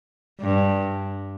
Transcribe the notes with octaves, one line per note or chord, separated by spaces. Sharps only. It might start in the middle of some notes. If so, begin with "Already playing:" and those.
G2